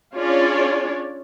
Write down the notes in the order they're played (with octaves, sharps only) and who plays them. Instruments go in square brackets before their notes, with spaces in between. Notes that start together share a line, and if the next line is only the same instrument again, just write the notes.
[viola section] C#4 D4 F4 G#4 C#5 D5